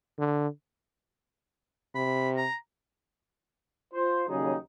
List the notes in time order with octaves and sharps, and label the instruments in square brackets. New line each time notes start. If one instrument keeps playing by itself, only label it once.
[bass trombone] D3
[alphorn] C3 [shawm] B5
[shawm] A#5
[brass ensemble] F4 C5
D#2 C#3 F#3 G3 D#4 G#4